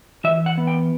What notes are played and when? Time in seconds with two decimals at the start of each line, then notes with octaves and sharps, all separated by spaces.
0.24 E3 E5
0.46 F#5
0.58 B3
0.67 G5